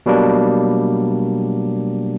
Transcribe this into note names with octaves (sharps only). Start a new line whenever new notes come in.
B2 F#3 G3 A#3 D4